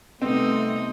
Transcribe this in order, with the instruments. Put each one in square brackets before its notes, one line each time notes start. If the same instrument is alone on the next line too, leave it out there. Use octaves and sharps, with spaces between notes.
[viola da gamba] C3 D#4 [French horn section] G3 A3 B3 [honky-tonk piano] C4